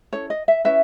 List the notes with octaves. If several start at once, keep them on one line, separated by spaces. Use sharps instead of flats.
C#4 E4 A4 C#5
D#5
E5
C#4 E4 B4 E5